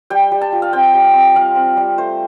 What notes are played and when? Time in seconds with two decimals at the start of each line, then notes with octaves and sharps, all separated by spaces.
0.10 G3 G5
0.32 G3
0.41 A5
0.52 F4
0.62 F5
0.73 C4 G5
0.94 G3
1.14 C4
1.35 G3 F5
1.56 C4
1.77 G3
1.98 A3 C5